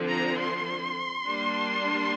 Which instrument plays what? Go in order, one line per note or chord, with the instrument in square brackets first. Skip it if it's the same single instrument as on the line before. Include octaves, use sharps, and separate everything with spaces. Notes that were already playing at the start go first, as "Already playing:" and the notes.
Already playing: [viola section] D3 F3 C4
A#5
C6
G3 A#3 D4